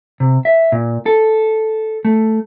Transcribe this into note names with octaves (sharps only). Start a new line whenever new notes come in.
C3
E5
A#2
A4
A3